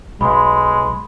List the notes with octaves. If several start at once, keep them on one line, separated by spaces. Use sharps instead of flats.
B1 G#3 B5 C6